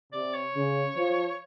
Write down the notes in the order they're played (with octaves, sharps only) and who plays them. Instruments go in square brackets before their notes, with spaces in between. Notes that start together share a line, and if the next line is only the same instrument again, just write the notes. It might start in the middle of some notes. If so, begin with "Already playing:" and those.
[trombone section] C3 [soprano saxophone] D5
[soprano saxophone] C#5
[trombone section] C#3
F3